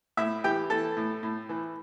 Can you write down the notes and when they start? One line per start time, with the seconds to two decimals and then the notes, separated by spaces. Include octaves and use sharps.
0.17 A2 E4 E5
0.44 E3 G4 G5
0.70 E3 A4 A5
0.97 A2
1.23 A2
1.49 E3